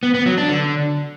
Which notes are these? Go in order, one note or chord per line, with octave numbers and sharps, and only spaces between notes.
B3
B3
F#3
D4
D3